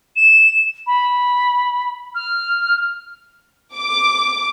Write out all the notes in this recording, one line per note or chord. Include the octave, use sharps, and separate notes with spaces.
E7
B5
F6
D6